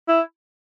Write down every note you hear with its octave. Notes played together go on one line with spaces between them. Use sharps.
E4